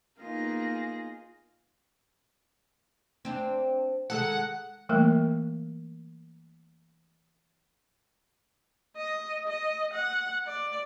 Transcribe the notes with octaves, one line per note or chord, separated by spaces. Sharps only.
A#3 B3 D#4 F4 G#4 A#6
C4 D4
D#3 G#3 A4 F#5
E3 G3 A3 A#3 A#4 G5
D#5
D#5
F#5
D5